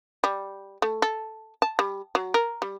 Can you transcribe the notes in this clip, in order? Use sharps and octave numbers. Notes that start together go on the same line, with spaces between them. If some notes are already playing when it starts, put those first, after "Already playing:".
G3
A3
A4
A5
G3
F#3
A#4
G3